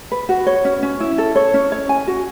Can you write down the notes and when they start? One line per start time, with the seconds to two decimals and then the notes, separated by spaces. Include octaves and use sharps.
0.11 B4
0.29 F#4
0.46 C#5
0.65 C#4
0.83 C#4
1.00 E4
1.18 A4
1.35 C#5
1.54 C#4
1.72 C#5
1.89 G#5
2.07 F#4